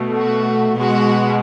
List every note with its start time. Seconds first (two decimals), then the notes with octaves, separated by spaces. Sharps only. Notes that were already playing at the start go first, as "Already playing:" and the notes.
Already playing: B2 A3
0.16 F#4
0.75 B2 G#3 F#4